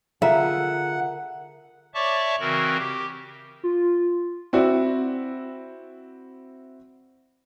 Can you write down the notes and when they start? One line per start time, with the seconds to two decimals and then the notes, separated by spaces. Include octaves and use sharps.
0.22 D3 F4 G#4 A#4 E5 F#5
1.94 C#5 D5 E5 A5 C#6 D6
2.40 C#3 E3 C4 F#4 A#4
2.77 G4
3.64 F4
4.53 C4 E4 F#4 D5